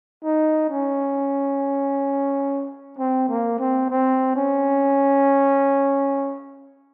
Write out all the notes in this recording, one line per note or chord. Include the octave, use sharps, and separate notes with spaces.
D#4
C#4
C4
A#3
C4
C4
C#4